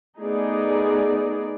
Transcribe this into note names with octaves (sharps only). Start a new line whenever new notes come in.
A3 B3 D#4 G#4 D5